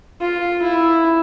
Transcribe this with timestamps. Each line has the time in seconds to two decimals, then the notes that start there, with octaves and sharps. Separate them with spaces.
0.21 F4
0.63 E4